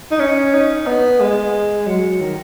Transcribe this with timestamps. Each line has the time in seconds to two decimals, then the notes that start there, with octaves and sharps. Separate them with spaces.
0.11 D#4
0.20 C#4
0.54 D#4
0.87 B3
1.20 G#3
1.87 F#3
2.21 D#3